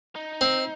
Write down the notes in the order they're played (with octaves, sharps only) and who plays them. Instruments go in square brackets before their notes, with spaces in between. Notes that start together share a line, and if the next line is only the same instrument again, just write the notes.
[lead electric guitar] D#4
[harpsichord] C4